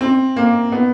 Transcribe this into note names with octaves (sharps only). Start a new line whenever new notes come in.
C4
A#3
B3